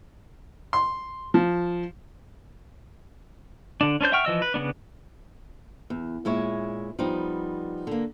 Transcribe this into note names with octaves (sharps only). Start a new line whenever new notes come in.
C6
F3
D3 D4
C#4 D4 C5 G6
E5 F#5 G5 C#6 F6
E3 F3 D#5 E6
B4
C#3 F3 B3 D4
E2
A#2 G#3 E4 C#5
F3 G3 B3 D#4
D3 A#3